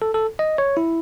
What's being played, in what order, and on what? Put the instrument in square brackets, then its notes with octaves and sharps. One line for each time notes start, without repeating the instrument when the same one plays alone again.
[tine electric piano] A4
A4
D#5
C#5
E4